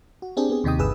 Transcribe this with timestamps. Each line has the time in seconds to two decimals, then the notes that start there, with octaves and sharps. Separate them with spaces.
0.22 F#4
0.37 C4 D4 G4 G#4
0.50 B3 G#4
0.64 D#2 C3 D#4 G5 D#6
0.79 G1 G2 G#4 B4 G5 E6